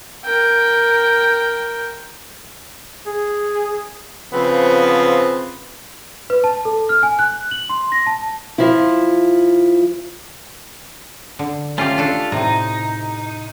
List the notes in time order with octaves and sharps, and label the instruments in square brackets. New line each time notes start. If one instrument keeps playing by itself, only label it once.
[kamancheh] A#4 G5
[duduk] G#4
[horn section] C#3 F3 B3 C4
[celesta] B4
A5
A4
F6
G#5
F#6
F#7
C6
A#6
A5
[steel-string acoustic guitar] F3 E4
[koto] D3
[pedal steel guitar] A3 F4 [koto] C#4 G4
[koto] D4 G4 A4
[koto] A2 C3 [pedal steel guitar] D#4